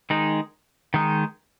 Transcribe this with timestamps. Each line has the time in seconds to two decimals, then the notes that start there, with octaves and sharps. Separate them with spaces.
0.10 D#3 G#3 D#4
0.94 D#3 G#3 D#4